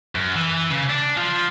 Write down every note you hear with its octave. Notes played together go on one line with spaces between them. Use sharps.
F#2
E3
C#3
D4
F3